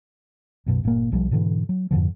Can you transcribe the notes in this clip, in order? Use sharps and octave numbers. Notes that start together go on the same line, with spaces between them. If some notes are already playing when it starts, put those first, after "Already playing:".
B1 F#2 B2
G1 A#2 C#3 A#3
B1 F3 G3
G#2 B2 D3 E3
F#3
F2 G#2 D3 F3